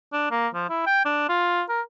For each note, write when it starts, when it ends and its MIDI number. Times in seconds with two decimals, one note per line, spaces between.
0.13 0.30 62
0.31 0.48 58
0.54 0.67 53
0.70 0.86 64
0.87 1.05 79
1.05 1.25 62
1.29 1.62 65
1.69 1.81 70